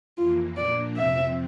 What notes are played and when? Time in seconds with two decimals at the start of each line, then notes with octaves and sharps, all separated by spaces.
0.18 F2 E3 A#3 F4
0.57 A#2 F3 A#3 D4 D5
0.97 F2 C3 F3 C4 E5